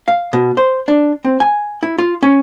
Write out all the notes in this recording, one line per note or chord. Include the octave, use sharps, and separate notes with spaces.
F5
B2
C5
D4
C4
G#5
E4
F4
C#4